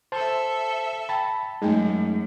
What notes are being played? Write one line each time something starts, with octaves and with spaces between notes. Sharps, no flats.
A4 C5 E5 A5
G5 A5 B5
F#2 G#3 A3 D#4